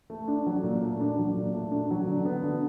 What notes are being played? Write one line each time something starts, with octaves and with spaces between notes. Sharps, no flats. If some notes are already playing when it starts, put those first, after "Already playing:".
A3
D4
F#3
A#2
A3
D4
F#3
A#2
A3
D4
F#3
D3
B3
D3